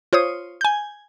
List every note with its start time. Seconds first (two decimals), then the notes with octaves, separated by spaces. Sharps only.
0.13 F4 C5 C#5 D#6
0.61 G#5 G6